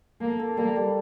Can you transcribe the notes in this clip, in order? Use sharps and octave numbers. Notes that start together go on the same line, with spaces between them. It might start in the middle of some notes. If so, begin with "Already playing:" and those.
A#3 A4
A4
G3 A#3
G3